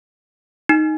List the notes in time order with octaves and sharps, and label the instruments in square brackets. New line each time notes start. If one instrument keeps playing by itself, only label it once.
[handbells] D#4